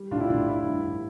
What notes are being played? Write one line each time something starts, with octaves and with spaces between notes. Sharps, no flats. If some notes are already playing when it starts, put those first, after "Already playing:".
Already playing: G3
A2 D4 F4
E4
A2 D4
A2 E4
G2
G2